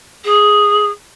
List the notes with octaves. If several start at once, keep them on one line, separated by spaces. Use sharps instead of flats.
G#4